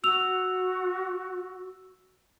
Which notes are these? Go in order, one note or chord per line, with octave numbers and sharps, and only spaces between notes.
F#4 E6 F7